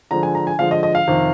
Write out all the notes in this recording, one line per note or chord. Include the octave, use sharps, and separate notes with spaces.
D3 F3 G#3 A#5
G#5
A#5
G#5
D3 F3 G#3 F5
D#5
D#5
F5
F2 C3 D#3